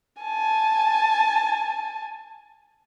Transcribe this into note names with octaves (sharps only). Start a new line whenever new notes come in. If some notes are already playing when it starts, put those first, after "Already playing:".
G#5 A5